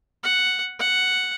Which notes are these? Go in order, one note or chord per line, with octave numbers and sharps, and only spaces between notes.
F#5
F#5